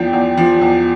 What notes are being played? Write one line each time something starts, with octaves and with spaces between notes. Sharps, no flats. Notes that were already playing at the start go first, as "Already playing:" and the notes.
Already playing: E2 F3 G5
E2
F3
E2